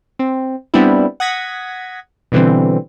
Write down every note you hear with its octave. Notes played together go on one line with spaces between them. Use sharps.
C4
G3 B3 C4 D4 E4
F#5 D#6 G#6 A#6 B6
B2 D3 E3 G3 C4